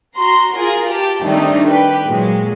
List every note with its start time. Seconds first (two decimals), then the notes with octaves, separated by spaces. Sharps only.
0.16 F#4 A#5 C6
0.56 F4 G#4 A#4
0.90 G4 A5
1.23 D#3 G3 A3 C4 D4 D#4
1.67 G4 B4
2.06 A#2 F#3 G#3